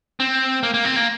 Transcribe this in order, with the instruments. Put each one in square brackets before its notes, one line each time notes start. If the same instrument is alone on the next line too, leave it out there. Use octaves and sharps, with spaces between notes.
[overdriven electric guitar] C4
A#3
A#3
C4
A#3